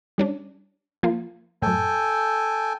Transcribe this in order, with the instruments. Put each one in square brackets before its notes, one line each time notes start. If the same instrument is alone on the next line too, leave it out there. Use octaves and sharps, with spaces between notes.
[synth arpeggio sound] G3 C#4 D4
F3 A#3 F4
[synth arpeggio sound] F#2 A2 [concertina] A4 G5 G#5